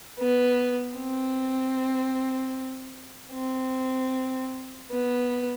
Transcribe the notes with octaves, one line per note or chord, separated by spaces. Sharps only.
B3
C4
C4
B3